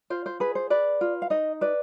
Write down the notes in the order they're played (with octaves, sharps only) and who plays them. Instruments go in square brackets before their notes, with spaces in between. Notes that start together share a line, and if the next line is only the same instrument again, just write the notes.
[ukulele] F4 C5
C5
G#4 B4
C5
B4 D5
F4
F5
D#4 D#5
B4 D5